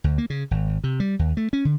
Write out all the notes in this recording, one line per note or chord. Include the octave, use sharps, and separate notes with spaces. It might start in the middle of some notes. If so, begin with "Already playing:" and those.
D2
A#3
C#3
G#1
C3
G3
D#2
A3
C#4
D3